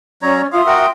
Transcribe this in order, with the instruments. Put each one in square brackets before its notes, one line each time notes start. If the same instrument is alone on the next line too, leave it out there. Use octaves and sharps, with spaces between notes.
[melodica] F#3 C#5 A#5 [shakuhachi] C#4 [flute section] D5
[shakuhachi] F4 [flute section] E5 C6 D#6 [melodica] F5
[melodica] F#4 A#4 F#5 [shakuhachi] G5